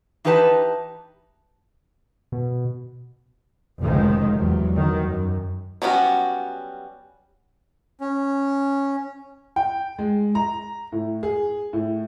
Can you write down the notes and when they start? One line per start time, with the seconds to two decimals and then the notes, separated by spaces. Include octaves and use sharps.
0.25 E3 D#4 G4 B4 F#5 A5
2.32 B2
3.81 F1 C#2 A2 D#3 F3 G#3
4.35 E2 F#3 G3
4.75 D#3 F#3
5.03 F#2
5.82 F#3 G3 B3 C#4 F#4
8.01 C#4
9.56 G5
9.99 G#3
10.35 A#5
10.92 A2
11.23 G#4
11.73 A2